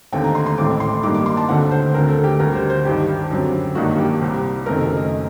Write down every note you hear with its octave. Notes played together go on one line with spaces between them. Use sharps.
D#2 D3 A3 C4 G5
A#5
C6
C6
A1 A2 A3 C4 D6
C6
G2 D#3 G3 A#3 D6
D6
C6
A5
D2 D3 A3 C4 F#5
C5
D2 D3 A3 C4 A#4
A4
G4
D2 D3 G3 A#4
C5
C5
G2 D#3 G3 G4
F#2 D3 F#3 C4
G2 D#3 F#3 A#3 F#4
G4
C2 C3 G3 C4
F#1 F#2 D#3 A3 C4 A#4
D#5